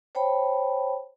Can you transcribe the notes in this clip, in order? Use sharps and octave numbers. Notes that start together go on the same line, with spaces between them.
C5 C#5 G5 A5 B5